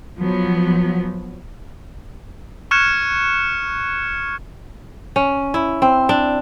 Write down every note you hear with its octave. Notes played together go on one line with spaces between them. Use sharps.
F3 F#3 B3
C#6 F6 F#6 G#6 C#7 E7
C#4
E4
C4
D4